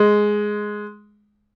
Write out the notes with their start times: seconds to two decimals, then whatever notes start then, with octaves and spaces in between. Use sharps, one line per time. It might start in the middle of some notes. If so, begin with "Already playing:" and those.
Already playing: G#3